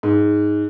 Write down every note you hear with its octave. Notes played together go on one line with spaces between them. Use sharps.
G#2